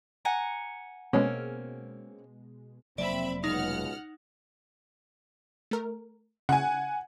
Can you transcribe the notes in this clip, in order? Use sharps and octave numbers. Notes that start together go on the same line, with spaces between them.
F#5 G#5 A#5
B2 G#3 A#3 C4 C#4
F1 F#3 A#3 C4 D5 E5 B5
C#2 B2 G#3 D#4 F#5 F6
A3 A#4
C#3 F#5 G#5